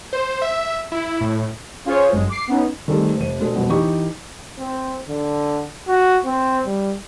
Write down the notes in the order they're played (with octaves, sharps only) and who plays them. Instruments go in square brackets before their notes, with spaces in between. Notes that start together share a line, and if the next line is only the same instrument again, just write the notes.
[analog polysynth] C5
E5
E4
A2
C#4 F4 G#4 C5 C#5
G1 F#2 G#3
D6 C7
B3 C#4 D#4
[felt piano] D#3 G3 A3 C4 G#4 A4
F1 D#7
B2 G#3 D4 A4
B1 F2 B2 B3
E3 D#4 G4 C#6
[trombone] C4
D3
F#4
C4
G3